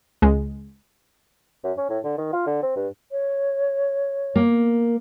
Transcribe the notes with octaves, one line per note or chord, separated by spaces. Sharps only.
C#2 G#3
F#2
C#4
A2
D3
D#3
F4
D3
C4
G2
C#5
A#3